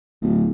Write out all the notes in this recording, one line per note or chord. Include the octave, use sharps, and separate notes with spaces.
D1